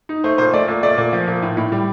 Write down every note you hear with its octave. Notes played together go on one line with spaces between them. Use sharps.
D#4
A3 C5
A#2 C5
A3 D5
A#2
A3 D5
A#2
F3
A#2
A2
A2
G3